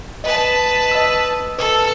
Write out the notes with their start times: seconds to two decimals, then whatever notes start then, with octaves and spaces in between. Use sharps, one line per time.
0.24 B4 D#5 A5
0.91 D#5 E6
1.58 A4 B4